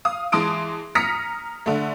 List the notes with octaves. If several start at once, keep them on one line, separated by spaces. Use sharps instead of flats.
F5 D#6
E3 G#3 A5 C6 D#6 D7
A#5 D#6 F6 A#6 B6 C#7
D3 A3